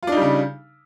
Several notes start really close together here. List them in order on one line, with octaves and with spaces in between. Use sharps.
F4 D4 D#4 G3 C#3